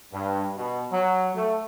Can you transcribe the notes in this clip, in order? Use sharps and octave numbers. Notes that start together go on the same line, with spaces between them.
G2
B2
F#3
A3